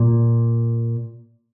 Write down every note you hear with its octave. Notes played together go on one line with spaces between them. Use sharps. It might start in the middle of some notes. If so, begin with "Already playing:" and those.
Already playing: A#2